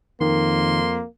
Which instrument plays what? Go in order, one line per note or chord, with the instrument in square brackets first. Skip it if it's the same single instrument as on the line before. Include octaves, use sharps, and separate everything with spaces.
[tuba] F2 [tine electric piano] D#3 [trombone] A#3 [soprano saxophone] C6